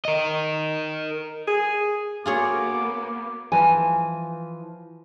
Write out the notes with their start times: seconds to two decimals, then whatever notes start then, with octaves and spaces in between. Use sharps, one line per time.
0.05 A#4 D#5
1.48 G#4
2.26 A#3 B3 F4 F#4 G#4 C#5 D6
3.52 E3 F3 G#5